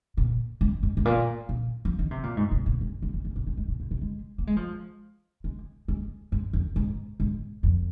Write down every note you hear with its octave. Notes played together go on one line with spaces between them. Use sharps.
A#2
G#2
G#2
G#2
A#2
A#2
F3
D#3
C3
A#2
G#2
C3
A#2
G#2
G#2
F2
G#2
A#2
G#3
G#3
A#2
A#2
C3
G#3
A#3
G#3
F3
G#3
G#3
G#2
F2
G#2
G#2
F2